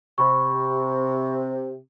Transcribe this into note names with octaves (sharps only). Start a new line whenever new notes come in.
C3 B5 C#6